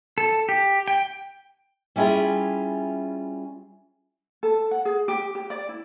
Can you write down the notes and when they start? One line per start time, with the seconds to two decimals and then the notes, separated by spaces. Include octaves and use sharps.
0.18 A4
0.49 G4
0.88 G5
1.96 G3 C#4 E4 F4 G#4 E5
4.43 A4
4.71 F#5
4.85 G#4
5.08 G4
5.35 G4
5.50 D5
5.69 E4